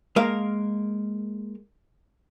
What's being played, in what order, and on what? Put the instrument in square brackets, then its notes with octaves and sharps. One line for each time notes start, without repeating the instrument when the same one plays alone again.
[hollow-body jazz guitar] G#3 A#3 A#4 F5